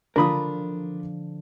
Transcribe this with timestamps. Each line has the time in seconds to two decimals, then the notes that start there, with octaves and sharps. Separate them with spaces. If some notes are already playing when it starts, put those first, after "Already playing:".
0.16 D3 F3 D4 F4 A#4 B5 D#6